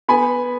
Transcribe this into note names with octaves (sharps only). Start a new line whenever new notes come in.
B3 G#5 B5